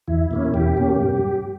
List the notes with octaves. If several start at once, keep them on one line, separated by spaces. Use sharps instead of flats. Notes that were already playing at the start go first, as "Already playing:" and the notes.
E2 E4
B2 A#3 C#4
E2 G4
B2 A#3 C#4
G2